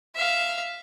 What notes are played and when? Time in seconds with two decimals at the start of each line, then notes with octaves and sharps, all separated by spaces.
0.16 E5 F5